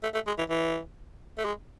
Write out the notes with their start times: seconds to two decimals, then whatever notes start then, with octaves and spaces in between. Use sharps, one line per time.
0.03 A3
0.14 A3
0.27 G#3
0.38 E3
0.50 E3
1.38 A3
1.45 G#3